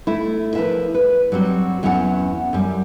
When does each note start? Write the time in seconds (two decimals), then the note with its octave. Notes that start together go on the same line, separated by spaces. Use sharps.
0.07 A3 E4
0.55 F3 E4 A#4 B4 E5
0.94 B4
1.32 F#3 G3 C4 F#4
1.83 E2 F#3 C#4 E4 D#5 F#5
2.53 F#2 G3